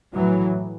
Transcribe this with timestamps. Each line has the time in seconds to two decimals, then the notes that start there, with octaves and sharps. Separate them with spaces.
0.14 A2 E3 F#3